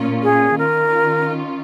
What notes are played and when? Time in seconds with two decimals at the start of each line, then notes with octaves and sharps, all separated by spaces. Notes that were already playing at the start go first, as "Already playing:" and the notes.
Already playing: A#2 A#3 C#4 F4
0.23 G#4
0.58 D#3 C#4 F4 A#4